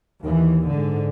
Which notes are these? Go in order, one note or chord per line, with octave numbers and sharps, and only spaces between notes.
D#2 E3
G#2 D3